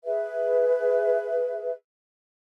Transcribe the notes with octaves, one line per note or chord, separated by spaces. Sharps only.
G#4 B4 E5